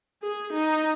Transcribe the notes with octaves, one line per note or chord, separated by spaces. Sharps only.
G#4
D#4